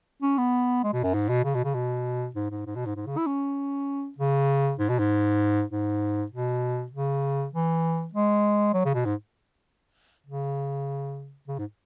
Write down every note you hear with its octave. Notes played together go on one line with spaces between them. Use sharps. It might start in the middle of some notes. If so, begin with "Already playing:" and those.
C#4
B3
G#3
B2
F#2
G#2
B2
C#3
B2
C#3
B2
G#2
G#2
G#2
B2
G#2
G#2
C#3
E4
C#4
C#3
G#2
B2
G#2
G#2
B2
C#3
E3
G#3
F#3
C#3
B2
G#2
C#3
C#3
G#2